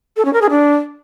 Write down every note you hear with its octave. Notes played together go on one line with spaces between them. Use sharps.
A4
C#4
A#4
G#4
D4